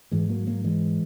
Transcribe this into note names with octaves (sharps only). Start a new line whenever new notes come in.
G#2 E3 G#3
F#3 A#3
F#3 A#3
E3 G#3